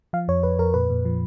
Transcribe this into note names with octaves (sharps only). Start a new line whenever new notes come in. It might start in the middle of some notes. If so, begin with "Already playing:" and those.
F3 F5
F2 C#5
F2 B4
F2 A#4
A#2 B4
A#2
F3